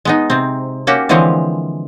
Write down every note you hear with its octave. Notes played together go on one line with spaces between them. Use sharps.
G#3 B3 D#4
C3 C4
A#3 C#4 F#4 G4
D3 E3 F3 G#3 C4 C#5